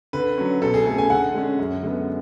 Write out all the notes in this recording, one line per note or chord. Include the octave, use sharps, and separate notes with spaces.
D3 B4
F#3 C#4
B2 A4
G#4
A3 C#4 A4
G#5
D3 F#5
G#3 C#4
F#2
D3 G#3 B3